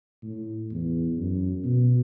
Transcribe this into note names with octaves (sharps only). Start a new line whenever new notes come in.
A2
E2
F#2
B2